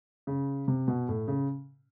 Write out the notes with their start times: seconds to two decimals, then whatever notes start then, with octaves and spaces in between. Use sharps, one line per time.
0.27 C#3
0.68 C3
0.88 B2
1.08 A2
1.28 C#3